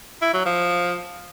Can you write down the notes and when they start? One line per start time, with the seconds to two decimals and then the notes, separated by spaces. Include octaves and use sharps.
0.22 E4
0.33 F#3
0.45 F3